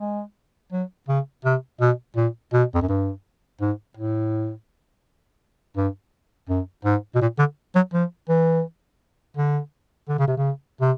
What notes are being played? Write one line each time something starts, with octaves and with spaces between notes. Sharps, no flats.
G#3
F#3
C#3
C3
B2
A#2
B2
F2
F#2
G2
G#2
A2
G2
F#2
G#2
B2
A#2
D3
F#3
F3
E3
D3
D3
C#3
C3
C#3
C3